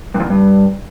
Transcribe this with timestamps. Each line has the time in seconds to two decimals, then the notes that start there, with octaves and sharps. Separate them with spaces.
0.14 G2
0.20 F2
0.25 E2
0.30 G2